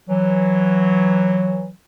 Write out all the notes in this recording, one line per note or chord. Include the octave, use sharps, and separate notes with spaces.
E3 F#3